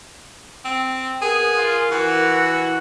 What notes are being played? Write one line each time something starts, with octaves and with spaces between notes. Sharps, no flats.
C4
B3 G#4 A#4
F4
E3 F#4